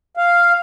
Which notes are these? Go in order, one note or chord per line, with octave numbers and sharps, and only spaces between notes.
F5